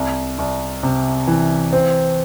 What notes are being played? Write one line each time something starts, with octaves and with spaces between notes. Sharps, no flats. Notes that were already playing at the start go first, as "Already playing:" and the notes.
Already playing: C2
C2
C3
E3
C4